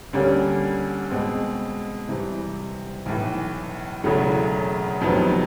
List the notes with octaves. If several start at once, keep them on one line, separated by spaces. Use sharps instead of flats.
D2 D3 G3 A#3 C#4
B2 G#3 C4
C3 E3 G3
B1 A2 E3
E1 E2 C#3 F#3 A3
F2 C3 D#3 F#3 B3